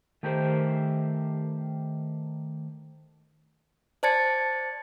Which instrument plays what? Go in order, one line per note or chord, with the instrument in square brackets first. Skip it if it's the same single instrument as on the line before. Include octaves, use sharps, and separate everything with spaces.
[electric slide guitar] D#3 A3 G4 A#4 C5
[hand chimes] C5 D5 A5 G#6 A6 C#7